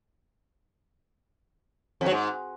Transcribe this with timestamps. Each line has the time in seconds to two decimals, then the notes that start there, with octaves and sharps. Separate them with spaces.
2.01 F2
2.06 F#3
2.11 G#2